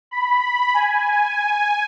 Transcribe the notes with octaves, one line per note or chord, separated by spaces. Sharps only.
B5
G#5